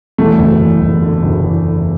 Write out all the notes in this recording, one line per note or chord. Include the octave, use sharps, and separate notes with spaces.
E2 A3
F#1
E2
F#1
D3
F#1
E2
D3